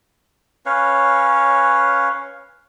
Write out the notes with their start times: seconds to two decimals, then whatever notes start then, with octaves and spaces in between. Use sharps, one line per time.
0.66 C#4 B4 C#5 F5